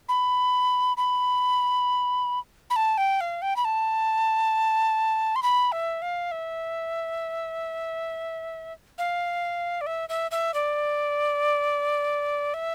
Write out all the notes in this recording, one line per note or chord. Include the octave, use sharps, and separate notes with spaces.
B5
B5
B5
A5
G5
F5
G5
B5
A5
C6
B5
E5
F5
E5
F5
D5
E5
E5
E5
D5
E5